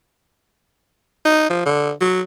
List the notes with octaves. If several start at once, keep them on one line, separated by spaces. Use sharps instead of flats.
D#4
F3
D3
F#3